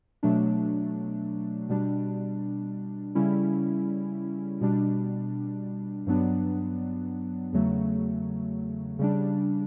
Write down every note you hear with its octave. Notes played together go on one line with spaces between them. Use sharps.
B2 F#3 A3 D4
B2 G3 D4
C#3 G3 C#4 E4
B2 G3 D4
G2 F#3 B3 D4
E2 C#3 F#3 A3
C#3 G3 D4